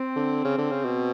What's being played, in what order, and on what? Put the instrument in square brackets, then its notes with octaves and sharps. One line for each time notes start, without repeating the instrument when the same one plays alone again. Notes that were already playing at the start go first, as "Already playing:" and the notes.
Already playing: [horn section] C4
[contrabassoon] D3
C#3
D3
C#3
B2